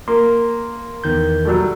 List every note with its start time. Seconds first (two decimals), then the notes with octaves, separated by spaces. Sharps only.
0.08 A#3 C6
1.04 E2 D#3 G6
1.45 F#3 G3 A3